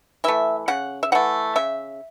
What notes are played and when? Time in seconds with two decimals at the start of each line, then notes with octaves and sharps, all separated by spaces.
0.24 E3 A3 E5
0.68 C#3 F#5
1.03 E5
1.12 E3 A3 F#5
1.56 C#3 E5